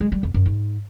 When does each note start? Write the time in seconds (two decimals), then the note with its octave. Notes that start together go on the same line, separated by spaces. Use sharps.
0.01 G#3
0.12 G3
0.23 F2
0.34 F#2
0.46 G#2